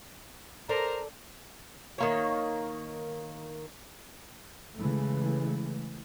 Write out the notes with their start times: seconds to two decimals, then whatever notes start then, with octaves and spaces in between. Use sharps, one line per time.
0.69 A4 A#4 C5 D5 A#5
1.98 D#3 A#3 C#5
4.77 C#3 E3 G#3 A3